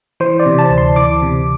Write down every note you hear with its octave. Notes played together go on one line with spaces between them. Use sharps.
E3 C5
D5
C3
A5
D2
C6
E3 D6
C3